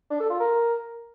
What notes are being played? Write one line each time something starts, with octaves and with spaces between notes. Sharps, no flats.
D4
A4
F4
A#4